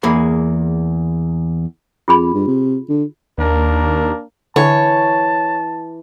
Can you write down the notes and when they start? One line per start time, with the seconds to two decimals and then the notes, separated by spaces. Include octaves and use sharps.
0.03 E2 A#3 G#4 B5
2.08 F2 F4 G#4 B5
2.34 G2
2.47 C3
2.89 D3
3.38 D#2 A#3 D4 A#4
4.56 D3 E3 C#5 A5